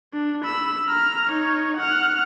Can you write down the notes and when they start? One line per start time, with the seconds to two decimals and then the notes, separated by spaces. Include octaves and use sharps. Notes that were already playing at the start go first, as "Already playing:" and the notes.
0.14 D4
0.45 B5 E6
0.88 A#5 F6
1.30 D#4 C#5
1.77 F#5 F6